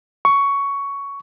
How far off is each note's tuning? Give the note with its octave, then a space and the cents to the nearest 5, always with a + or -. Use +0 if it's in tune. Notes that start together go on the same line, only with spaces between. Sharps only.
C#6 +10